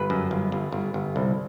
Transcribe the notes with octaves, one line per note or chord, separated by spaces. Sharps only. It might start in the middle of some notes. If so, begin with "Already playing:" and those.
Already playing: G1 B4
F#2
G1
G1
G1
G1
C2